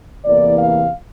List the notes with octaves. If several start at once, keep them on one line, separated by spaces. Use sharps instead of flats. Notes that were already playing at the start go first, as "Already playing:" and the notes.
E2 C3 E3 A#3 D5
F5